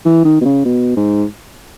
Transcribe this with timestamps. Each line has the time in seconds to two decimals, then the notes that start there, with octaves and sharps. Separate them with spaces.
0.05 E3
0.25 D#3
0.41 B2
0.45 C#3
0.65 B2
0.97 G#2